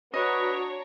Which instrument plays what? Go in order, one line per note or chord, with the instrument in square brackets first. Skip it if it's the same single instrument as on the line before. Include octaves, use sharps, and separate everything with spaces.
[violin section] D4 C#5 A#5 [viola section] F#4 [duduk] B4 [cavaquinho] D#5